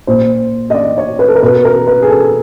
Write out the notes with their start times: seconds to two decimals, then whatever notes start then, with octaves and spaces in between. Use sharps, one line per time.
0.07 A#2 C5
0.70 D#5
0.74 D5
0.98 C#5
1.19 B4
1.28 A4
1.35 A#4
1.43 B2 B4
1.65 A#4
1.87 B4
2.02 G#4
2.09 A4